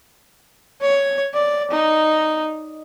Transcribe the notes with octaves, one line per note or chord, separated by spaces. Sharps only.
C#5
D5
D#4